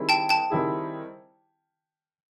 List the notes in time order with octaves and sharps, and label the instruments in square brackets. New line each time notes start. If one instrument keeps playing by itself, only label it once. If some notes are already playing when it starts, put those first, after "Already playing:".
Already playing: [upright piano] D#3 G3 C4 E4 G#4
[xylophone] G5 A5
G5 A5
[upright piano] D#3 G3 C4 E4 G#4